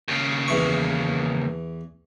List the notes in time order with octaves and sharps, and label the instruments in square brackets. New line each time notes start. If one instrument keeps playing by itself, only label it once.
[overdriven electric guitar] D#2 C#3
[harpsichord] E2 E3 C#6